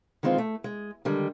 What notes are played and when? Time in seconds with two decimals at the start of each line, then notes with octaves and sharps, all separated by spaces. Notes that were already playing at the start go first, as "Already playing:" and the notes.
0.23 D#3 E3 G#3 C4 F4
0.38 A3
0.64 G#3
1.05 D3 D#3 G3 G#3